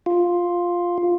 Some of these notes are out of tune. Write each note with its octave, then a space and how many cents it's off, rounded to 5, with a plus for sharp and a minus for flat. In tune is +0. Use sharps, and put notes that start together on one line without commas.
F4 +5